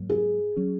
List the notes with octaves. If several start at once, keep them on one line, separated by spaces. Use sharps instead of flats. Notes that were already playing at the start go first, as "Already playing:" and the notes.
Already playing: G#2 F#3 A#3
G#4
F#3 C#4